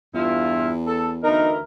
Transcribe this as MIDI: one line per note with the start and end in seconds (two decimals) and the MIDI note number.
0.14 1.52 40
0.14 0.68 43
0.14 0.68 64
0.14 0.68 65
0.87 1.11 69
1.24 1.60 38
1.24 1.60 52
1.24 1.53 63
1.24 1.60 70